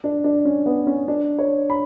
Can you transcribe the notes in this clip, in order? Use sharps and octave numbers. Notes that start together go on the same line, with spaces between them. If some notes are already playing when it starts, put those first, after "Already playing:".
D4
D4
C#4
B3
C#4
D4
C#5
B5